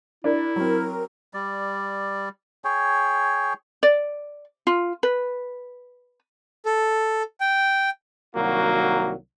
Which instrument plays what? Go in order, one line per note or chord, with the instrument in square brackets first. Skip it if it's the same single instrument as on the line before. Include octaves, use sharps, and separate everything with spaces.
[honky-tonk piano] D4 A#4 D5 [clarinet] E4
[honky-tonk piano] F#3 C4 [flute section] A#4
[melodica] G3 D5
G#4 C#5 G5
[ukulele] D5
F4
B4
[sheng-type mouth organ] A4
G5
[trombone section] C2 D#3 F#3 A#3 F#4